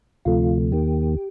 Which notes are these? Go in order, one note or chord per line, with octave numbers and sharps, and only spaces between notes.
D2 C3 F3 A3 F4
D#2 D#3 A#3 G4